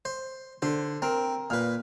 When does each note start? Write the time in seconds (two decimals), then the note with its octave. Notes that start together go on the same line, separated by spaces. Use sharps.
0.05 C5
0.62 D3 C5
1.02 C4 A#4
1.50 A#2 B4 F6